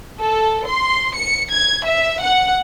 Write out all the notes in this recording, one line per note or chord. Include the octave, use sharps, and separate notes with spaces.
A4
C6
C#7
G#6
E5
F#5